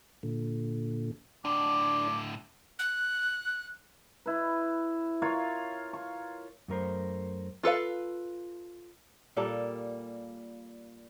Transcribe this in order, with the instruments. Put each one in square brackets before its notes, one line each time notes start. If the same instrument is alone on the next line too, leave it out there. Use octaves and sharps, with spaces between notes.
[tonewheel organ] A#2 D3
[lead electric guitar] A2 D3 [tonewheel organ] D4 [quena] D6
[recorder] F#6
[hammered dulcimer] E4 B4
F4 A#4 C#5 F5
C#6
[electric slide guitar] F#2 A3 A#4 C5
[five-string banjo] F4 A4 B4 F5
[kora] A#2 G3 A#3 A4